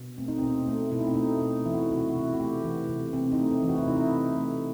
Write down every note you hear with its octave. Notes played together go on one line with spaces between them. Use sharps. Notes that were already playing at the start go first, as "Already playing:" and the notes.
Already playing: B2
A3 C4
D#4
B2 C4
A3
B2 E4
D#4
C4
A3 D#4
B2
E3 E4
F#4
E4
C3 F#4
E4
F#4
C3 E4
F#4
A3 G4
E3
C3
C3 C4
D#4
A3
C4
E3
F#4
E4
C3 D#4
E4
C3
A3